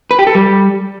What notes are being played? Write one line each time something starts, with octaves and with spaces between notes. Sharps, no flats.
B4
G4
A4
G3